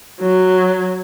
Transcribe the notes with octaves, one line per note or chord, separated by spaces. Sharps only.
F#3